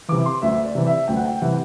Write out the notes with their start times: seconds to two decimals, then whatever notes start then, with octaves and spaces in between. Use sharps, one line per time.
0.08 C3 E3 D6
0.26 C6
0.42 D2 E5
0.64 D5
0.75 C3 E3
0.87 E5
1.08 D2 G5
1.16 F#5
1.25 G5
1.42 C3 E3 F#5